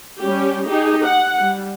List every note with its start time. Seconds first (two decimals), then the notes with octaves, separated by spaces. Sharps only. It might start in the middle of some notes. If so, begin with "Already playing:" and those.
0.20 G3 C#4 G4
0.67 D#4 G4 G#4
1.04 F#5
1.41 G3